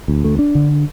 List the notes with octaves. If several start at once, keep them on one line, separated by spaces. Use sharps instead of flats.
D2
A3
D4
D3